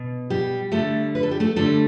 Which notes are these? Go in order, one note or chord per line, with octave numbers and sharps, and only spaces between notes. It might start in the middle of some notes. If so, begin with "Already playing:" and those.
Already playing: B2
G3 G4
D3 G3 A3 A4
B4
A4
G4
A3 A4
D3 G3 A3 A4